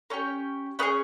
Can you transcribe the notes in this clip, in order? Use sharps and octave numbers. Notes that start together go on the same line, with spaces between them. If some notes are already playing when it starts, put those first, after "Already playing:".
C#4 G4 A#4 C#5
C#4 G#4 B4 D#5